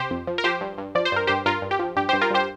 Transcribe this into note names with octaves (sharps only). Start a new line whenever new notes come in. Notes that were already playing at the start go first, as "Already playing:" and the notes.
Already playing: C3 G4 C5
F2
F3
A#4
F3 G4 C5
G2
G2
F3 D5
C5
G2 A#4
G2 G4 C5
G2 F4 A#4
G2
G4
F3
G2 G4
G2 G4 C5
F4 A#4
G2 G4 C5